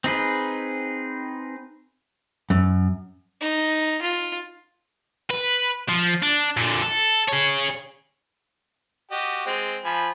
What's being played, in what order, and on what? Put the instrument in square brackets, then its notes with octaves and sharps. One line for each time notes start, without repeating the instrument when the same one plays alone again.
[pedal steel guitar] C4 D#4 G#4 B4
[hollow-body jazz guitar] F#2
[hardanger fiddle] D#4
F4
[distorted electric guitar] B4
F3
D4
A#2 D3
A4
G#4 C#5
[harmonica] F#4 G4 D#5
G#3 C4
F3 G#5 B5